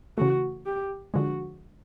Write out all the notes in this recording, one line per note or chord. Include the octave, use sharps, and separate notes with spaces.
C#3 E3 A3 F#4
G4
D3 F3 G#3 F#4